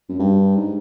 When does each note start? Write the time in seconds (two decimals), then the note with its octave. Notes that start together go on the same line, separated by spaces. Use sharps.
0.09 F#2
0.19 G2
0.55 G#2